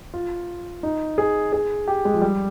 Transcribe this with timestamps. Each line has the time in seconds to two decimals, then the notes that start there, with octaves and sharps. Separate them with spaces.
0.14 F4
0.83 D#4
1.18 G#4
1.53 G#4
1.88 G4
2.05 G#3
2.14 F3
2.22 G3